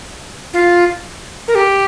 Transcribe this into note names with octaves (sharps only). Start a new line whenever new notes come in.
F4
A#4
G4